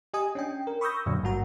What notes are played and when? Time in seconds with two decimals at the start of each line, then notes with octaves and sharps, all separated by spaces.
0.14 G4 D#5 G#5 D#6
0.35 C#4 D4 G5
0.67 A#4
0.81 B5 C#6 D#6 E6 G6 A#6
1.06 F#2 A#2 D3 F#3 D4
1.22 G#1 G2 A#3 F#4 A#5